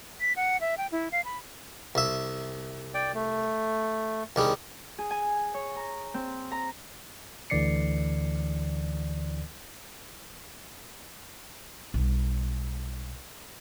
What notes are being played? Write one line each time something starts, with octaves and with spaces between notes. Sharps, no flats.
B6
F#5
E5
G5
E4
F5
B5
C2 E5
D5 G5
A3
C2 D#3 G3 G#3
G#4
G#5
C#5
A#5
C4
A#5
D2 D3 E3 D5 C7 C#7
B1 G3